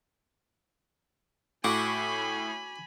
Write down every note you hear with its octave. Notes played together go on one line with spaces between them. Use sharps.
A2 F#4 G#5 B5 D6